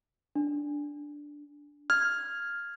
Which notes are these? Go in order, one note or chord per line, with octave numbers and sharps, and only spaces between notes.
D4
F6 G#6